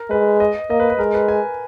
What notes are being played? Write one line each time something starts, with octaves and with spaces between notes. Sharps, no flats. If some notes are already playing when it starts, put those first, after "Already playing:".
Already playing: A#4
G#3 B4
D#5
A#3 D#5
B4
B4
G#3 A#4
B4
G#5